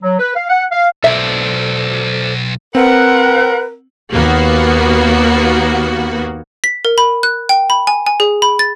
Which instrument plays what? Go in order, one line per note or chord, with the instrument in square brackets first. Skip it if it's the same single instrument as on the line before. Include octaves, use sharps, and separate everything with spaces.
[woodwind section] F#3
B4
F5
F#5
F5
[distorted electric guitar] B1 [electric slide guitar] A4 C5 D5 [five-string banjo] E5
[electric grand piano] C4 [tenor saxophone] A#4 [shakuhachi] B4 [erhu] F#5
[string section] D#2 A#3 B3 F#4
[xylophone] B6
A#4
B5
F#6
G5
B5
G#5
G#5
G#4
B5
A6